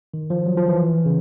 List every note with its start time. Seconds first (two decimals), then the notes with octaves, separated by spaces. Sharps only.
0.14 D#3
0.30 F3
0.46 F#3
0.57 F3
0.68 E3
1.05 C#3